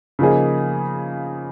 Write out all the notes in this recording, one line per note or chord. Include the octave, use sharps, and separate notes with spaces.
C#3 F3 A#3 D#4 G#4